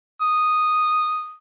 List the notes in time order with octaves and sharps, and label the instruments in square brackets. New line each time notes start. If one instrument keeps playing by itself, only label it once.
[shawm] D#6